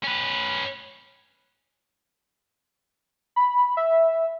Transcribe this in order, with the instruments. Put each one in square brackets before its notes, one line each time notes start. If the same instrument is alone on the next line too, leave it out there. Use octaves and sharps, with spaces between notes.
[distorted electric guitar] C#4 B4
[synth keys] B5
E5